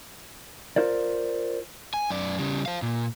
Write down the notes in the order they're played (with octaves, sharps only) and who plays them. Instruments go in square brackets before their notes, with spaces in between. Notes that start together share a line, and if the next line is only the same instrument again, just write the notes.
[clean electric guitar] F4 A#4 C5 D5
[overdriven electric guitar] G#5
F#2 D5
C#3 G3
C5 F5
A#2